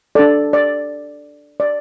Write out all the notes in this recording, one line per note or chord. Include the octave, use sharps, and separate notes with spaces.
D4 A4 D5
D5
D5